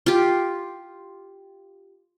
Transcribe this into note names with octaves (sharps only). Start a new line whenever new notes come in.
F4 G4